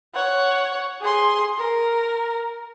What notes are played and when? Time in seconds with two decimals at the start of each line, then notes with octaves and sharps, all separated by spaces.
0.14 C#5 F#5
1.01 G#4 C6
1.58 A#4